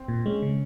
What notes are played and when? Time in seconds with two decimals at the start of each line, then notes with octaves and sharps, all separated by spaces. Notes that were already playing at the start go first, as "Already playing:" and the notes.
Already playing: C4
0.08 A#2
0.26 G#3 C#4
0.42 C#3